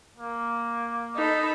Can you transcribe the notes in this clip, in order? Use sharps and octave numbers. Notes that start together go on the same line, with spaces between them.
A#3
D#4 A4 B5